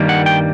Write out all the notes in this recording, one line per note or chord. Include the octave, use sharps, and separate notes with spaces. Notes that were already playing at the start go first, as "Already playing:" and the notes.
Already playing: G2 D#3 G3 A#3
F#5
G5